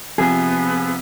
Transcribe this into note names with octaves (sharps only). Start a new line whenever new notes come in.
C3 F3 B3 G#4